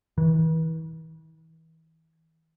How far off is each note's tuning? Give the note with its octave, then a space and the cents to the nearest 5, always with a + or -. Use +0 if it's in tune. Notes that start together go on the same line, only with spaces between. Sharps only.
E3 -40